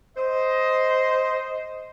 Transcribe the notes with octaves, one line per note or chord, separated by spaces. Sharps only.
C5 D#5